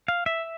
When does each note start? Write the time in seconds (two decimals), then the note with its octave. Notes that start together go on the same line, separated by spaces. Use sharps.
0.08 F5
0.26 E5